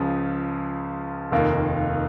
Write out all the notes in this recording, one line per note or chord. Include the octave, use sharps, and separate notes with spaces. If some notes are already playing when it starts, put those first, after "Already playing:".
Already playing: C#2 C#3 F3
F1 D#2 D#3 A#3 F4